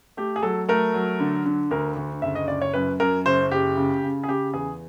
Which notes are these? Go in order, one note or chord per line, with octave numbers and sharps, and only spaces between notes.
A3 G4
G#4
F#3 A4
A3 A#4
F#3
D3
D3
D2 A#4
D2
F#1 E5
D#5
F#1 D5
C#5
F#2 B4
F#2 A#4
F#1 C5
F#1 G4
C#3
C#3
G#4
C#3 G4
E2 G#4